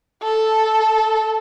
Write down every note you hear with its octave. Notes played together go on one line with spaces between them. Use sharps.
A4